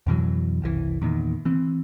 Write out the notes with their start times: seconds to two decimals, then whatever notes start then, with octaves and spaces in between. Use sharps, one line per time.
0.07 F2 B2 E3 F#3
0.62 F#1 C2 E3
1.02 E2 A#2 D#3
1.45 E3 C4